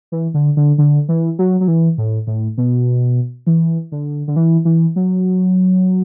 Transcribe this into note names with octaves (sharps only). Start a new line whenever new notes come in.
E3
D3
D3
D3
E3
F#3
F#3
E3
A2
A2
B2
E3
D3
D3
E3
E3
F#3